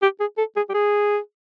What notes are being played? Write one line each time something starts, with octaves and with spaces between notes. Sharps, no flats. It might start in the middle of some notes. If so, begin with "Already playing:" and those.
G4
G#4
A4
G#4
G4
G#4